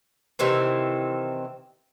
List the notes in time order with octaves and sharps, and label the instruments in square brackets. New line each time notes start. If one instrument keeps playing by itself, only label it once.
[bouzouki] C3 D#3 E3 C4